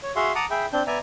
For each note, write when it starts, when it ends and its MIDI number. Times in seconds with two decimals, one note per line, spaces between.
0.03 0.12 73
0.16 0.32 66
0.16 0.32 68
0.16 0.32 76
0.16 0.32 77
0.16 0.32 84
0.35 0.45 78
0.35 0.45 81
0.35 0.45 82
0.35 0.45 86
0.35 0.45 87
0.50 0.66 68
0.50 0.66 76
0.50 0.66 79
0.50 0.66 83
0.73 0.83 60
0.73 0.83 62
0.73 0.83 91
0.87 0.98 59
0.87 0.98 74
0.87 0.98 76
0.87 0.98 80
0.87 0.98 82